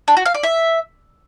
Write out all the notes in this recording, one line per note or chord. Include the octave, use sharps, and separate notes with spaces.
D4
F#4
F5
D5
E5